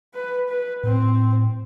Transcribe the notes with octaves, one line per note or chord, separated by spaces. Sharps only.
B4
B4
A2 C4